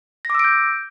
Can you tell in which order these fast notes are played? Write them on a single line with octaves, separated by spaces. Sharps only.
A#6 D6 E6 D7 G6